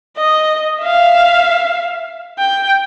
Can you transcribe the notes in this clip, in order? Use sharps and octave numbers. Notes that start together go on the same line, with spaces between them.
D#5
E5 F5
G5